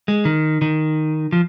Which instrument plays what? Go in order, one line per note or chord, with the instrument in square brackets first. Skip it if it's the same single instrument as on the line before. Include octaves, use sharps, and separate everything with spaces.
[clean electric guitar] G#3
D#3
D#3
F3